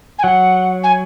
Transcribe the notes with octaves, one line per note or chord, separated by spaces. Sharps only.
G#5
F#3 F#5
G#5